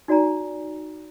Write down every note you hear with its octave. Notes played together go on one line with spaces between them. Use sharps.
D#4 F#4 D5 G#5 A#5